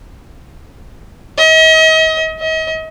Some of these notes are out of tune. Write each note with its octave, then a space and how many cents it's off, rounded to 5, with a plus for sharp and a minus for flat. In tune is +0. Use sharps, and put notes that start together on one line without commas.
D#5 +40
D#5 +40